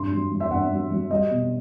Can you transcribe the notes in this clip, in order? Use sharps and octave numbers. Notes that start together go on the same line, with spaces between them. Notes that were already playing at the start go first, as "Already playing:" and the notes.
Already playing: G2 C6
F#3
F#3
E5
G2 F#5
F#3
F#3
G3 D#5
B2